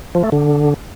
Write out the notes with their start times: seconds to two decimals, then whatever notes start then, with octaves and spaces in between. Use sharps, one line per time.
0.15 F3
0.24 A3
0.32 D3